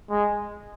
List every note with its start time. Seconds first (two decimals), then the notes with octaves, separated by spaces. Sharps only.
0.10 G#3